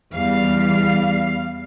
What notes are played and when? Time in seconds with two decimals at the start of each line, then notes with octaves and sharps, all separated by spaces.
0.14 E2 G3 F5